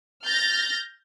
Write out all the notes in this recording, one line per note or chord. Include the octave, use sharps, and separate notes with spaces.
F6 G6 A6 A#6